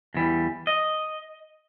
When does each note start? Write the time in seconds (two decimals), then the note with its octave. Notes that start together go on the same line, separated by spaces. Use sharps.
0.14 E2 E3 G3
0.67 D#5